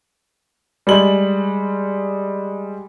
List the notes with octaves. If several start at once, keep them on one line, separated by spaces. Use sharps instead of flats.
G3 G#3 F#7